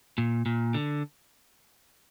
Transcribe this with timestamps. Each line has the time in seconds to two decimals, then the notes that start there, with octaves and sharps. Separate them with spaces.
0.18 A#2
0.46 A#2
0.74 D3